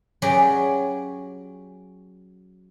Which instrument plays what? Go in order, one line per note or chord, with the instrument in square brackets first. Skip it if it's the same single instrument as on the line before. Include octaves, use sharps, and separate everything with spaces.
[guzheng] F#3 C#4 G4 G#4 B4 D5